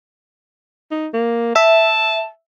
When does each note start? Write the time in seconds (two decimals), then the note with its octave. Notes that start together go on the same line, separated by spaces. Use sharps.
0.92 D#4
1.14 A#3
1.56 E5 A5